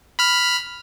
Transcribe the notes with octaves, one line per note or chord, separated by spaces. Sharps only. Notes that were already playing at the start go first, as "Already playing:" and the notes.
B5 F6